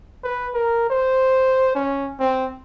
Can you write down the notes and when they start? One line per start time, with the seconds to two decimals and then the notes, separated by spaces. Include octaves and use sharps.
0.24 B4
0.54 A#4
0.90 C5
1.75 C#4
2.20 C4